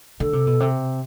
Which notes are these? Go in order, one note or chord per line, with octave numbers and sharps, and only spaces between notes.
D3 A4
C3
B2
C3